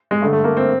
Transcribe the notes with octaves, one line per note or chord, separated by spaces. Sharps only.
G#3
G2 D3 A3
A3
A#3
C4